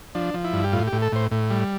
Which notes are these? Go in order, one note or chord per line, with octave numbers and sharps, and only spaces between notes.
F3 D4
F3
E4
G2
G4
A2 F4
G4
A2
A4
A2 C5
A2
G3